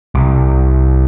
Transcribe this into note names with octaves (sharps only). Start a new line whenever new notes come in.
C2